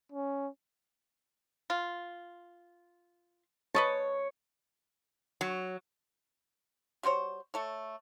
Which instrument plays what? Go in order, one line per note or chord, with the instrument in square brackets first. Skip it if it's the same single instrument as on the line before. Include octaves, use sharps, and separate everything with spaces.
[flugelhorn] C#4
[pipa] F4
[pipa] B4 D#5 A5 [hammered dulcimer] C#5
[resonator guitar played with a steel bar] F#3
[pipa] G3 F#4 C5 C#5
A3 A4 C#5